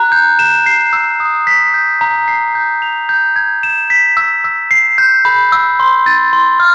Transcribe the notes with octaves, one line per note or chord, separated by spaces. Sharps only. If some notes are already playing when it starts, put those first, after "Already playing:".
Already playing: A#5 F#6
G6
E7
C7
E6
D#6
B6
G6
A#5
C7
G6
F7
G6
G#6
E7
B6
E6
E6
C7
G6
B5
E6
C6
A6
C6
F6